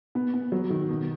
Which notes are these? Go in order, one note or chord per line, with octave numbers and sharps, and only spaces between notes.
B3
B3
F#3
D#3
B2